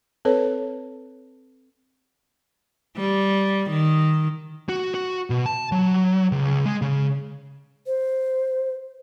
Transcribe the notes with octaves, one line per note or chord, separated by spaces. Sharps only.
C4 A4 B4 C#5
G3
D#3
F#4
F#4
B2
A5
F#3
C#2
G#3
C#3
C5